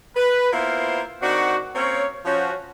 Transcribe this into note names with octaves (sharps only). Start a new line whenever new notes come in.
B4
A#3 B3 E4 F4 C5 F5
D#3 C4 D4 F#4
A#3 C4 C#4 C#5
F3 C#4 F#4